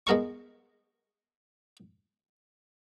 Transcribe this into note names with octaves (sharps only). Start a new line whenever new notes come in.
G#3 B3 A#4 A5 C#6